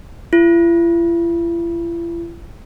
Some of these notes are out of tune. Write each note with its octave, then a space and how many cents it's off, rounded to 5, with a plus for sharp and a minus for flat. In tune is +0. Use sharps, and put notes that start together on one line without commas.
E4 +45